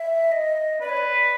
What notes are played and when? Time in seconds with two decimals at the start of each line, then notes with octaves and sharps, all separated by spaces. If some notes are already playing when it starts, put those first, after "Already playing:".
Already playing: E5
0.32 D#5
0.80 B4 D5
0.89 C#5
0.97 D5